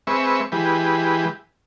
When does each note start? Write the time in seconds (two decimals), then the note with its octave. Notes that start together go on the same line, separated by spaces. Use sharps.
0.07 G#3 C4 B4 E5 C#6
0.52 E3 G#3 G4 B4